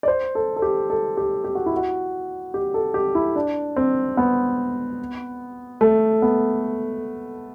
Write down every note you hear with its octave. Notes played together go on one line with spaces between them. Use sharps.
D5
C5
A4
A4
G4
A4
G4
G4
F#4
E4
F#4
G4
A4
G4
E4
D4
C4
B3
A3
B3